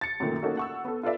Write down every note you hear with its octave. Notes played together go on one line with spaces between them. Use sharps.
A6 C#7
F#2 A#2 D#3 A3
A#3 C#4 D#4 F#4 A4
F#5 C#6 E6
B3 A4
F4 A4 B4 D5 E5